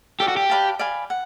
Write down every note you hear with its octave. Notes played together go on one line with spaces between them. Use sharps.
G4 A4 D5 F5
F#4
G4
B4 D5 F5 A5
D5 F5 G#5 B5
F#5